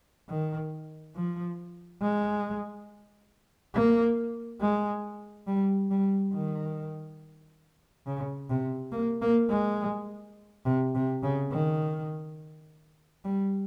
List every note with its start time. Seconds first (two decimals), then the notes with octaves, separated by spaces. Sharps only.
0.29 D#3
1.15 F3
2.02 G#3
3.74 A#3
4.61 G#3
5.47 G3
5.91 G3
6.34 D#3
8.07 C#3
8.50 C3
8.92 A#3
9.22 A#3
9.50 G#3
10.65 C3
10.95 C3
11.23 C#3
11.51 D#3
13.25 G3